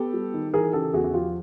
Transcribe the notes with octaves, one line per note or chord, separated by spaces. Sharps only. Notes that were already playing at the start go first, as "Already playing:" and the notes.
Already playing: B3 G4 A4
G3
D#3
E3 G#4 A#4
C#3 G4 A4
E2 F#4 G#4
F#4
F3 F4 G4